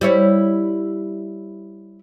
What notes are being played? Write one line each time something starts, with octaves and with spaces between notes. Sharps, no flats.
G3 E4 C#5